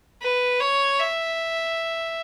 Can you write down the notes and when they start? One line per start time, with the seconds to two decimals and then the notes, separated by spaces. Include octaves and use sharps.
0.22 B4
0.60 C#5
0.99 E5